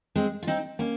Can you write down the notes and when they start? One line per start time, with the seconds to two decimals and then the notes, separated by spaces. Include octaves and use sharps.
0.15 G#3 C4
0.42 F4
0.47 C4 D#4
0.79 A#3 C#4